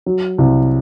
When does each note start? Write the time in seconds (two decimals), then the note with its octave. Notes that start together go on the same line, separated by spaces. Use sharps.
0.06 F#3
0.38 C2